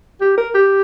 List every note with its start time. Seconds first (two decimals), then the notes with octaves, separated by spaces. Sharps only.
0.21 G4
0.37 A#4
0.54 G4